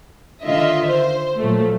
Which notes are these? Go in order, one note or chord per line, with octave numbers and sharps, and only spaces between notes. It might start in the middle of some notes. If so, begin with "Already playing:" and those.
D3 D#3 F4 D#5 E5
C5
A#2 F3 F#3 A3